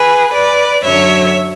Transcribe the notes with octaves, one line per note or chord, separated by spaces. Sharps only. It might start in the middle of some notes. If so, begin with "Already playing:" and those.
Already playing: G#4 B4
B4 D5
F#2 D3 F#3 C#5 E5